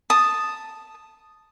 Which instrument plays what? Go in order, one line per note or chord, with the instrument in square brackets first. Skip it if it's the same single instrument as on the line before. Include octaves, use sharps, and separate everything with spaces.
[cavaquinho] A5 D#6